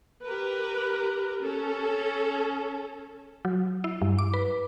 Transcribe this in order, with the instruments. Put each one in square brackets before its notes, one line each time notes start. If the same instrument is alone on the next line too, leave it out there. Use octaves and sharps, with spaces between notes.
[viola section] G4 A#4 B4
C#4 A4
[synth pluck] F#3
E4
G2
D6
B4